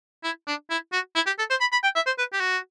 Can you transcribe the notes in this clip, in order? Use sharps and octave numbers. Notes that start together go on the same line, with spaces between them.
E4
D4
E4
F#4
E4
G4
A4
C5
B5
B5
G5
E5
C5
B4
G4
F#4